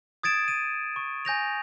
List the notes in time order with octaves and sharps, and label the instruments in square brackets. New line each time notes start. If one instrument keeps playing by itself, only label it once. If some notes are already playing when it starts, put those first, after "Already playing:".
[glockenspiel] D#6 G#6 A6 D7 E7
D#7
C#6
G#5 G6 A#6 F7